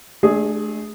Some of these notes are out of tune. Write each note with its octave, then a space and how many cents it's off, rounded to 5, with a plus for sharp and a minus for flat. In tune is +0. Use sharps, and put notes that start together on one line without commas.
A3 -35 D4 +10 G#4 +0